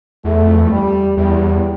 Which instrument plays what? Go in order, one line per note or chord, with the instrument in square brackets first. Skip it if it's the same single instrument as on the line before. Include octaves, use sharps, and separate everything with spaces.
[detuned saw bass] E2 [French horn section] A3
[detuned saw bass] F2
E2
[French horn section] G3
[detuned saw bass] E2 [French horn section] G3